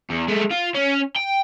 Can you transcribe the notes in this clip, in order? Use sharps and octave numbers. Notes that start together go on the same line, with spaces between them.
E2
G#3 A3
F4
C#4
G5